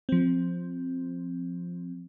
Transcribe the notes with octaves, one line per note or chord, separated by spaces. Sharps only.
F3 C4